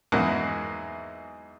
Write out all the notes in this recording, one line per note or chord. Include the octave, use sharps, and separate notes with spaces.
E2 G#2 F#3 A#3 D#4 F#5